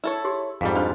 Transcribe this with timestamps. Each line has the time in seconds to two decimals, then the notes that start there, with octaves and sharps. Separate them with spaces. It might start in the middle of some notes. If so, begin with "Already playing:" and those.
0.04 E4 A4 C#5
0.25 G4 G#4 C6
0.61 F2 G#2 G3 F5
0.75 D4 F4 C5